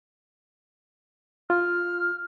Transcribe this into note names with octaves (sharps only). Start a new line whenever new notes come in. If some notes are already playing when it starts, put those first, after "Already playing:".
F4 F6